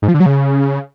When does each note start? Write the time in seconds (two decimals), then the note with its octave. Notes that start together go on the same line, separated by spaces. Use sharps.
0.02 G#2
0.08 F3
0.14 D3
0.20 F#3
0.26 C#3